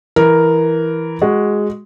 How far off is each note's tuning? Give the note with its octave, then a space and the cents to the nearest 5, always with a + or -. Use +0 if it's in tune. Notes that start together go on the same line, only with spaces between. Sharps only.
E3 +0 A#4 +0
G#3 +0 F#4 +0